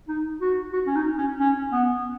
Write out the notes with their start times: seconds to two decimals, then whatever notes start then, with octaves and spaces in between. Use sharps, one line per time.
0.08 D#4
0.41 F#4
0.73 F#4
0.87 C#4
0.96 D#4
1.18 C#4
1.40 C#4
1.72 B3